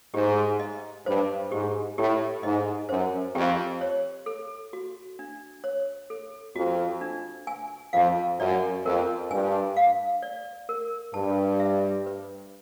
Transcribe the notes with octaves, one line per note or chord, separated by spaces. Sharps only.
G#2 G4
D#5
G2 C5
G#2 G4
A2 G4
G#2 D#5
F#2 C5
F2 G4
C#5
A4
F#4
D4
C#5
A4
F2 F#4
D4
G#5
F2 F5
F#2 D5
F2 A#4
G2 G#5
F5
D5
A#4
G2 A5
E5
B4